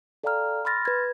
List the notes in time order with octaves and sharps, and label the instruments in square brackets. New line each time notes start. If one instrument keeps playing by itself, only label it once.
[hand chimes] A4 D5 F5 G5 A#5 F6
B5 C6 F6 A6 A#6
B4 G#6